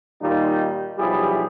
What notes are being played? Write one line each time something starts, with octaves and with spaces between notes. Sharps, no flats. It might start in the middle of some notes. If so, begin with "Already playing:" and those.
A#2 D#3 G3 D#4 F4
B1 F3 G3 E4 G#4